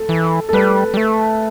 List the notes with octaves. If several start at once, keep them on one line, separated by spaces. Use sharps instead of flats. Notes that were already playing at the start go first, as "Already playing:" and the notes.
Already playing: A4
E3
A4
G3 B4
G3
A3